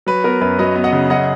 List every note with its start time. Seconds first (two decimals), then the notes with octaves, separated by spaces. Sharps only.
0.06 F#3 B4
0.24 B3 A#4
0.41 F#2 B4
0.59 F#3 B4 D#5
0.75 B3
0.84 D#5 F#5
0.93 C#3
1.10 F#2 D#5 F#5